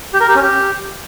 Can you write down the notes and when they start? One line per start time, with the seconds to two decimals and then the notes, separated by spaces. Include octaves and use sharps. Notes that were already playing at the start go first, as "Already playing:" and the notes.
0.13 G4
0.21 A#4
0.28 G4
0.35 C#4
0.43 G4